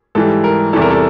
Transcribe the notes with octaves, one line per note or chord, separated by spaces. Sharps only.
G#2 E3 G3 A4
A#4
E2 C3 E3 G3 A4
A#4
A4